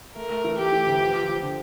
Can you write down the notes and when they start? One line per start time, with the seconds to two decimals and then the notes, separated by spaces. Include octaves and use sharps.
0.15 A3 A#4
0.30 A3
0.44 E3
0.58 A3 G4
0.72 E3
0.87 D2
1.00 F3
1.14 F3
1.28 F3
1.42 D3